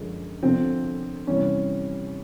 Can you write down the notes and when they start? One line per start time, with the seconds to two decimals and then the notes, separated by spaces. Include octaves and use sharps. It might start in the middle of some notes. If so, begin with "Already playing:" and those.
Already playing: F#2 D3 F3 G#3
0.43 F2 D3 F3 C4
1.27 C3 E3 G3 C#4